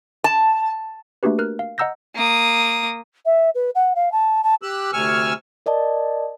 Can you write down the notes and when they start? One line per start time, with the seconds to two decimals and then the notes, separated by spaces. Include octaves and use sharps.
0.24 A5
1.23 A3 A#3 D4 F#4 G4 B4
1.39 A#4 F6 F#6
1.59 F5
1.78 D#5 F#5 A#5 E6 G6 A#6
2.15 A#3 D#6
3.25 E5
3.54 B4
3.75 F#5
3.95 F5
4.12 A5
4.43 A5
4.62 G4 E6 F#6
4.93 D2 C3 G#5 C#6 E6 F6
5.66 A#4 D5 D#5 A5